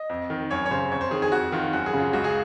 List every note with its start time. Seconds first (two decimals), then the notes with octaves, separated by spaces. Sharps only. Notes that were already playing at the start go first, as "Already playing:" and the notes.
Already playing: D#5
0.10 F2
0.30 D#3
0.51 F#2 C#5
0.66 C#5
0.71 C#3 C5
0.91 F2 C#5
1.01 C5
1.11 D#3 G#4
1.22 G#4
1.32 F2 F#4
1.52 D#3 F4
1.73 F#2 F#4
1.86 G#4
1.94 C#3
2.00 F4
2.13 C#2 F#4
2.24 G#4